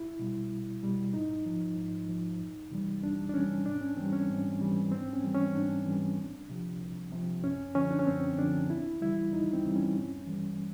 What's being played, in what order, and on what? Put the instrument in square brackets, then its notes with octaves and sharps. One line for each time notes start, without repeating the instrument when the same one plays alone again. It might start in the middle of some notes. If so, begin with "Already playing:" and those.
Already playing: [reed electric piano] C2 E4
B2 G3
C2
B2 G3
G#2 D#4
F3
G#2
F3
F2
C3 E3 G3
F2 D4
D4
C3 E3 G3 C#4
G#2 D4
C#4
E3 G3 C4
C#4
G#2
E3 G3
G#2 C4
C#4
E3 G3
C#4
G#2 D4
E3 G3
C2
C3 F3
C2
C3 F3
F#2 C#4
D3 F3 C#4
D4
C#4
F#2 C4
D3 F3 D4
D#2 E4
C#3 E3 G3 E4
D#2 D#4
C4
C#3 E3 G3
C#4
G2
E3 G3